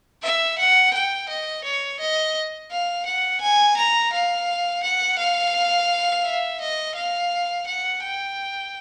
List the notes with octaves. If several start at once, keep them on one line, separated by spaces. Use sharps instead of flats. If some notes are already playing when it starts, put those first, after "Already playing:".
E5
F#5
G5
D#5
C#5
D#5
F5
F#5
G#5
A#5
F5
F#5
F5
E5
D#5
F5
F#5
G5